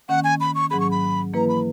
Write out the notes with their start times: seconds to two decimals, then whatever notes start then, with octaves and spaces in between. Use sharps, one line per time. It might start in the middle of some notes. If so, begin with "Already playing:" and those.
0.09 D#3 A#3 C#4 F#5
0.24 G#5
0.40 B5
0.55 C#6
0.70 G#2 F#3 C#4 G#4 B5
0.80 C#6
0.91 B5
1.33 E3 A#3 E4 B4 A#5
1.48 B5